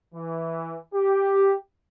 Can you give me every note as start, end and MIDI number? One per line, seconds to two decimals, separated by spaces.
0.15 0.78 52
0.95 1.54 67